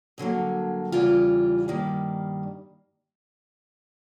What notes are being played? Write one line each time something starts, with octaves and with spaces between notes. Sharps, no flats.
G2 D3 F#3 A#3
E2 C#3 E3 G3 F4
G2 D#3 G3 A#3